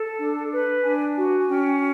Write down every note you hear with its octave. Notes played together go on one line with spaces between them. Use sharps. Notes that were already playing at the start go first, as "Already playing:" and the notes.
Already playing: A4 A5
D4
B4
D4 G#5
F#4 G#5
G#5
C#4 G5